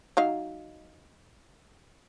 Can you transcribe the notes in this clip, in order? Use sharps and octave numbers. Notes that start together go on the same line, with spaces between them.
F#3 D#4 F5